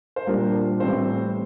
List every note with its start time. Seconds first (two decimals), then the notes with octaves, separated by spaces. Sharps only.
0.16 C5
0.27 A#2 G3 D4 A#4
0.80 A2 E3 G3 C4 C5